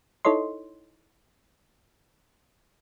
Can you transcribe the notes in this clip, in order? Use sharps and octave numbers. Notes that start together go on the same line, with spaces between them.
D#4 E4 A4 C#5 D#5 C6